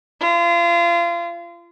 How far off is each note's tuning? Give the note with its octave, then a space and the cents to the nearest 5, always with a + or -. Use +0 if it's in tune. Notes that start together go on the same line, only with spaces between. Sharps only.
F4 -30